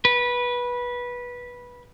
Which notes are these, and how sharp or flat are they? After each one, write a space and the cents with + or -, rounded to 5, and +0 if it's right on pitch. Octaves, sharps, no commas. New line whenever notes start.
B4 -15